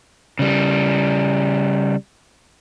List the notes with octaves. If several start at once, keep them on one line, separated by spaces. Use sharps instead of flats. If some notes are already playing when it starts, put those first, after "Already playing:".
C#3 G3